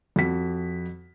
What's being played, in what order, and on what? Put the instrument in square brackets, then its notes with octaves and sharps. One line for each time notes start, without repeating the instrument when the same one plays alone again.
[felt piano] F2 F#4 B6